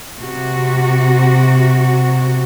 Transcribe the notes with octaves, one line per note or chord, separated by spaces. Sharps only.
C3 F#4